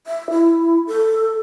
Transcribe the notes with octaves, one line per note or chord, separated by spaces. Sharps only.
E5
E4
A4